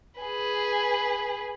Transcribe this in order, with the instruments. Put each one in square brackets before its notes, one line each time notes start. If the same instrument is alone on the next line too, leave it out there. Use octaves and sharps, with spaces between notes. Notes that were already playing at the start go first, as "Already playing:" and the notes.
[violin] G#4 B4